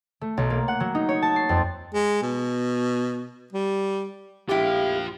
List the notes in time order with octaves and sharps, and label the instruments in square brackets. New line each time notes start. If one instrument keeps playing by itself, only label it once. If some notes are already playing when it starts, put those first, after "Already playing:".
[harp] A3
B1
A#3
F#5
F#3
D#4
C#5
A5
C7
F2
[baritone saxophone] G#3
B2
G3
[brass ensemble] A#1 F5 [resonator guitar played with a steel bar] A2 G#3 E4 [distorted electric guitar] F4 G5 [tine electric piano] G4